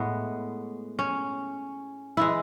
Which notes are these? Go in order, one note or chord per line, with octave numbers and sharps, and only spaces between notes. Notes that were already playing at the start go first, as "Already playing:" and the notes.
Already playing: A2 G#3 B3
C#4
E3 G#3 E4